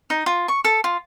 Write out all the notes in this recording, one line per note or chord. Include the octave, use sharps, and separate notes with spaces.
D#4
F4
C#6
A4
F4